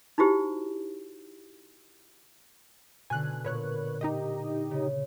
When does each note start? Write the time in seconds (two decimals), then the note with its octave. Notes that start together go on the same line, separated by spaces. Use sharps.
0.18 D#4 E4 F#4 G4 C5
3.10 B2 D3 G#5 F#6
3.45 A#2 B4 C#5 F#6
4.01 D#4 G4 D#5
4.71 C#3